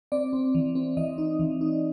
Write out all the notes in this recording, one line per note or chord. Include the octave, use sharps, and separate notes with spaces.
C4 D5
C4
E3
C4
E3 D#5
D#4
E3
D#4